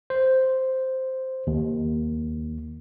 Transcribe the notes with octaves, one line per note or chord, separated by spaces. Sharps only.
C5
D#2